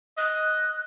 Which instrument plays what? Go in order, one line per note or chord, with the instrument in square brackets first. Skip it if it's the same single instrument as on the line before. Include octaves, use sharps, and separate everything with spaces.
[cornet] D#5 [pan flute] F#6